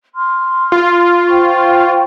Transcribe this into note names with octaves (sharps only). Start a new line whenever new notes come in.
C6 F6
F4
C5 G5 C#6